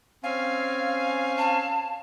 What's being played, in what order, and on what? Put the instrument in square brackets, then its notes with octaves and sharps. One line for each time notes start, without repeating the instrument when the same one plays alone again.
[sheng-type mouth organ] C4 C#4 G#5 [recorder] F5
[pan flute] A5